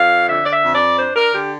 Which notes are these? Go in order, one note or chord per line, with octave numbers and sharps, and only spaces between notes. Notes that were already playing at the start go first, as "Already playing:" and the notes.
Already playing: F2 F5
D3 E5
D5
E5
F2
D5
D4 C5
A#4
D3 G4